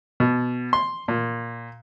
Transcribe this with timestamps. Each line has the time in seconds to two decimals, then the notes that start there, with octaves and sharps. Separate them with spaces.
0.20 B2
0.73 C6
1.08 A#2